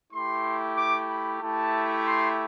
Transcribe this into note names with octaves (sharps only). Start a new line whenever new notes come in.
A3 E4 G4 C6
D6
B5
A3 E4 G4 A5
C6